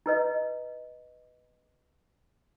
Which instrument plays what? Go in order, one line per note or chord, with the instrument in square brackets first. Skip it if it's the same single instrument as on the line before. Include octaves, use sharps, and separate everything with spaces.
[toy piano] E4 B4 D#5